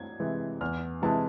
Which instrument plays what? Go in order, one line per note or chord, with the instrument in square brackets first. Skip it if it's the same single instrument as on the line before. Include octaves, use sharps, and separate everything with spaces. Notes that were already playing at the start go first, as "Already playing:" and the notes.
Already playing: [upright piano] G#6
[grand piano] C3 E3 G#3
[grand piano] E2 [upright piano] F6
[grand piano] C3 E3 G#3 [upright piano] A5